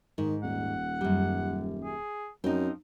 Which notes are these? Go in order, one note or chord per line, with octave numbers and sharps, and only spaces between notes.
G#2 D#3
D#1 F#5
F#2 G3
G#4
F#2 F3 C4 D#4